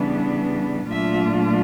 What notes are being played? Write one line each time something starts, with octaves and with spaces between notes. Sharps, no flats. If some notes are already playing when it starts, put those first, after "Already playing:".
Already playing: C#3 E3 G3 B3 D4
A#2 F#3 A3 D4 F4 E5